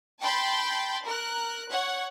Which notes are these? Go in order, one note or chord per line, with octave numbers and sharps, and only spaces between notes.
G5 A5 B5 C6 G6 A6
A#4 F#6
C#5 F#5